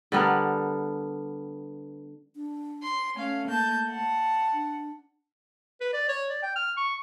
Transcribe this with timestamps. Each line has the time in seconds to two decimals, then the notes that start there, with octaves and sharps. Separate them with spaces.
0.12 D3 G3 B3 A#4
2.35 D4
2.84 C6
3.16 A3 C#4 F5
3.49 A#3 A5 G6
3.89 F#5 A5
4.53 D4
5.81 B4
5.93 D5
6.09 C#5
6.30 D5
6.43 G5
6.56 F6
6.77 C#6